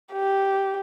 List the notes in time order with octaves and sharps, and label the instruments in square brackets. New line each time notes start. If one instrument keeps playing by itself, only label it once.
[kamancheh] G4